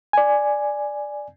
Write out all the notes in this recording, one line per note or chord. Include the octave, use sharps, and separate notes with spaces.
D5 G#5